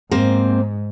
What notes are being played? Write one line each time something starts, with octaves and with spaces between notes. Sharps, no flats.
G#2 A#3 C4 C5